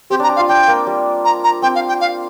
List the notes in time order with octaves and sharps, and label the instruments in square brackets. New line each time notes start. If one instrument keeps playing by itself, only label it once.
[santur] C4 [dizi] G4
[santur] D4 [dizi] A#5
[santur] G4
[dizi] F5
[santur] F4
[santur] D4 [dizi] G5
[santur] A#3
G3
[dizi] A#5
A#5
[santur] C4 [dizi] G5
[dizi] F5
G5
F5